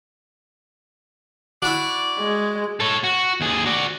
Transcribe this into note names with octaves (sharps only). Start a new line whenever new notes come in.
E4 F#4 D5
G#3
A4 C#5
F#4
D#2 G#4
F#4 D5